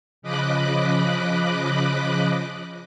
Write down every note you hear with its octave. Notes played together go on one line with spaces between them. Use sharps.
C#3 F3 D#5 B5 D6 F#6